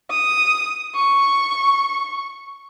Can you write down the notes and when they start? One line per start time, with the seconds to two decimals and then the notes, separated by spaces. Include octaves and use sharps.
0.11 D#6
0.96 C#6